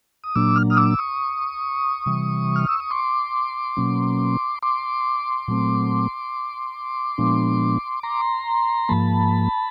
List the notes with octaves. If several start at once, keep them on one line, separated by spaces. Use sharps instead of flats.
D#6
A#2 F#3 A#3 D4 D6 E6
F6
D#6 F6
D6 E6
C#6 D#6
C3 E3 G3
F6
E6
D#6
C6 D6
B2 F#3 A#3 C#4
C6 D6
A#2 F#3 A3 C4
A#2 F3 G#3 B3 D4
A#5 C6
G#2 F3 A#3 A5 B5